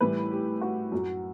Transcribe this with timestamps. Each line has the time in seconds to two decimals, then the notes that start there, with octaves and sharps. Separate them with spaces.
0.01 A2 E3 G3 B4
0.31 G4
0.62 F#4
0.92 F#2 F#3